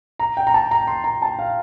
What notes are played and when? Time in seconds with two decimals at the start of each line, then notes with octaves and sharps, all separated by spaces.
0.19 A#5
0.37 G5
0.47 A#5
0.54 A5
0.71 A#5
0.87 C6
1.04 A#5
1.22 A5
1.39 F5